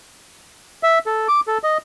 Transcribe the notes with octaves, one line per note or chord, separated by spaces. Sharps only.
E5
A4
D6
A4
D#5